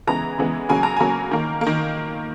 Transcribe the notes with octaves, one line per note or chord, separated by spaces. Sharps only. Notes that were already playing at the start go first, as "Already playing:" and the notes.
C#3 E3 G#3 B3 A#5
C#3 E3 G#3 B3
C#3 F#3 A#3 G#5
A#5
C#3 F#3 A#3 G#5
D#3 A#3
A#3
D#3